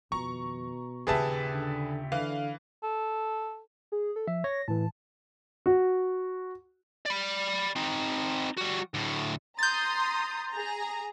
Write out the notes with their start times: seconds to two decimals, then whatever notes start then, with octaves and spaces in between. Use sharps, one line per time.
0.12 F2 B2 D#3 A#5 C#6
1.07 A#1 D#2 C#3 G4 G#4 B4 E5 A5
1.54 D3
2.12 D3 E3 F5
2.83 A4
3.92 G#4
4.16 A4
4.28 F3 E5
4.44 C#5 A#6
4.68 A2 E3 A5
5.66 F#4
7.06 D5 B5
7.76 C4 D#4
8.58 G3 F#4
8.94 D2 A2
9.59 A#5 C6 D#6 G6 A6
10.51 G#4 A#5